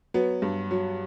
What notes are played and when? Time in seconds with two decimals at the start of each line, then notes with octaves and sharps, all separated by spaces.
0.14 F#3 B3
0.42 G2
0.71 F#3